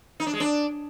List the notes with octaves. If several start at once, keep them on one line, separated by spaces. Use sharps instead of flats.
D#4
D4
G#3
D4